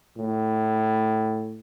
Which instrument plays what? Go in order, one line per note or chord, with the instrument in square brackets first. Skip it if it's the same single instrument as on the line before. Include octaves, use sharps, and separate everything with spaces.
[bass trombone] A2